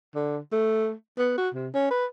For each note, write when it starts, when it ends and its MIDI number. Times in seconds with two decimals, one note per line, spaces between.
0.15 0.38 50
0.52 0.93 57
1.18 1.35 59
1.38 1.49 66
1.54 1.68 48
1.74 1.89 61
1.91 2.05 71